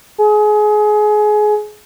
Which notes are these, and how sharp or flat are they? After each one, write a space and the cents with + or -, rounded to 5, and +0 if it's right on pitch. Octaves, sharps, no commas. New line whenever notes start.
G#4 +25